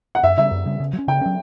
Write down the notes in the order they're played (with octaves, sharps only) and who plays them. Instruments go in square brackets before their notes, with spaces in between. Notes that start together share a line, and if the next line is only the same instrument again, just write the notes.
[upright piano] F#5
[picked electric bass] F#2 [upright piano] E5
[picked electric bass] C#3 G3 [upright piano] E5
[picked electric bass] F#2
C#3 G3
C#3
F#3
C#4
[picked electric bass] C#3 [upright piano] G5
[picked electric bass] F#3 C#4